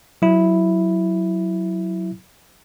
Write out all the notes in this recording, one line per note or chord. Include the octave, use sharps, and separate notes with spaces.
F#3 E4